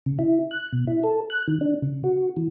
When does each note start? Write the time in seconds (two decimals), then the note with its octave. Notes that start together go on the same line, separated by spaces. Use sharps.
0.06 C#3
0.19 E4
0.51 F#6
0.72 B2
0.87 E4
1.04 A4
1.30 F#6
1.48 D#3
1.61 D4
1.82 C#3
2.04 F#4
2.36 E3